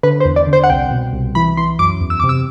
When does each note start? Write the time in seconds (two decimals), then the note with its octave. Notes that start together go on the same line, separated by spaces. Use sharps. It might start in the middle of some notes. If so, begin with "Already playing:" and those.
0.03 D3 B4
0.20 C5
0.25 E2
0.36 D5
0.47 D3
0.53 C5
0.64 F#5
0.69 C2 G5
0.91 B2
1.13 C2
1.35 E3 B5
1.57 E3 C6
1.79 F#2 D6
2.01 E2
2.10 E6
2.20 C3 D6
2.29 E6